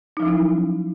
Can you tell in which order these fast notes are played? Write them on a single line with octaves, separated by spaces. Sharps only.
D#4 F#3 F3 C#4 E4